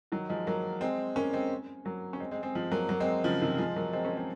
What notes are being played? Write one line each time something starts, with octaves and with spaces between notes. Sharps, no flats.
D#3 F#3
F3 G#3
F#3 A#3
G#3 C4
A#3 C#4
G#3 C4
F#3 A#3
C#4
G#3 C4
G#3 C4
G#3 C4
F3 G#3
F#3 A#3
F#3 A#3
G#3 C4
C#3 F3
C3 D#3
F3 G#3
F#3 A#3
G#3 C4
A#3 C#4
G#3 C4